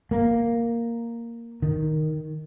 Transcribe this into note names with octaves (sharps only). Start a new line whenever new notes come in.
A#3
D#3